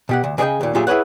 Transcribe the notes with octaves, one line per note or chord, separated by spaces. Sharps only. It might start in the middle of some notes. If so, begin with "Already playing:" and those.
B2 G4 F#5
D2
C#3 G#4 D5 D#5 G5
D#2 A#2
A#2 F#3 F4 G4 G#4 E5
E4 G#4 B4 C#5 F#5